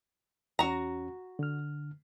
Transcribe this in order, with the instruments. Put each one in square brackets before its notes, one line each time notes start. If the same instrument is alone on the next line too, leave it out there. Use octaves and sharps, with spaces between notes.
[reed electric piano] E2 C#4 [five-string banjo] F#4 A#5
[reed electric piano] D3 F6